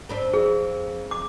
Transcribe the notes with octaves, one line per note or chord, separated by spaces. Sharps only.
C4 D4 B4
F2 G#4
D6